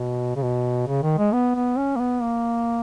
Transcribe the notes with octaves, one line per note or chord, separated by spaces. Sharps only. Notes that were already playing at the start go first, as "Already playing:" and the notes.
Already playing: B2
C#3
B2
C#3
D#3
G#3
B3
B3
C#4
A#3
B3
A#3